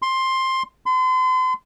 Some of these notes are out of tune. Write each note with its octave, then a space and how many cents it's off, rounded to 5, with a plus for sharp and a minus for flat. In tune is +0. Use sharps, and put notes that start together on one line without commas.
C6 +10
C6 -40